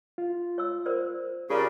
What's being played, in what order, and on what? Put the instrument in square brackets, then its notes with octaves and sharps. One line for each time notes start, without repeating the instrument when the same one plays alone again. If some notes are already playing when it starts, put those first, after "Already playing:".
[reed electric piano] F4
[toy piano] C#5 E6
A#4 C5 D5
[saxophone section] C#3 [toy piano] F4 [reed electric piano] G4 [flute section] A#4 D5